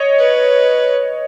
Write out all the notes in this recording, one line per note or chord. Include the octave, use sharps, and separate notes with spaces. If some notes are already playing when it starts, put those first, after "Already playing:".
Already playing: C#5 D#5
B4